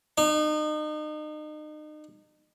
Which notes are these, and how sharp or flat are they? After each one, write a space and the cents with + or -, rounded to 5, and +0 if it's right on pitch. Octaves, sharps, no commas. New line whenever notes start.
D#4 -35